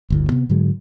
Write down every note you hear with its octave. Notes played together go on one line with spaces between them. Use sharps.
G1 D2 A2
C3 B3
G#2 D3 F#3 G#3